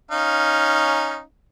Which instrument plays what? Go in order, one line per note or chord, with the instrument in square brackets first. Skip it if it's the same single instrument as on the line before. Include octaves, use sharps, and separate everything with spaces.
[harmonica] C#4 D#4 F5